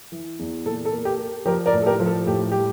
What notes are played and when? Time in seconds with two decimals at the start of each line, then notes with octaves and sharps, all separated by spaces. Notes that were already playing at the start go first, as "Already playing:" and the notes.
0.12 E3
0.39 E2
0.66 A#2 A4
0.85 A4
0.92 A#3
1.05 G4
1.19 A#3
1.46 F3 G4 A#4
1.66 A#4 D5
1.73 A2
1.82 A4
1.86 G4 A#4
2.00 F3
2.06 A4
2.26 A2 G4
2.52 G3 G4